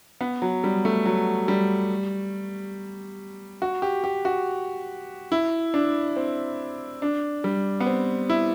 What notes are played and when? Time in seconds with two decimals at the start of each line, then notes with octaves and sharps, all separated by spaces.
0.21 B3
0.42 F#3
0.64 G3
0.85 A3
1.06 F#3
1.48 G3
3.62 F#4
3.82 G4
4.04 G4
4.25 F#4
5.32 E4
5.74 D4
6.16 C4
7.02 D4
7.44 G3
7.80 B3
7.87 C4
8.30 E4